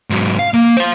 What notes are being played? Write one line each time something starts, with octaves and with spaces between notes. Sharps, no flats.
G#2 F#3
F5
A#3
C5 F5